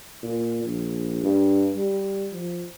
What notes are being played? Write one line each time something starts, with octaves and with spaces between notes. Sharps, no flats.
A#2
A#1
G2
G3
F3